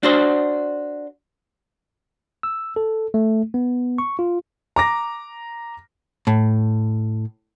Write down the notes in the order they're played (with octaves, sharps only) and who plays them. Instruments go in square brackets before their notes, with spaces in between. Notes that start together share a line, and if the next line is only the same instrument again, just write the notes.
[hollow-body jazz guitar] D4 F#4 C5
[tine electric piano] E6
A4
A3
B3
C#6
F4
[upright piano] A#5 D6 A#6
[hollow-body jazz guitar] A2